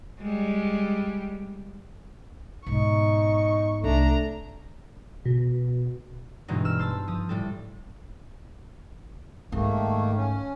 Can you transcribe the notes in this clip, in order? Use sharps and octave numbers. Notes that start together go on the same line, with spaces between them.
G3 G#3
G#2 B2 D#4 C#6
C2 A3 D4 A#5
B2
G2 B2 E3 G#3 D#4
E6 F6 E7
C5 A5 E6
F3 D#6
A2 G3 A4
G#2 D#3 A3 A#3
C#4